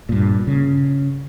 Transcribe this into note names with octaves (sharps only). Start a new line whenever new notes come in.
G2 A#2
C#3